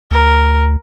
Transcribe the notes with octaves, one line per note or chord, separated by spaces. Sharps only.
D2 A#4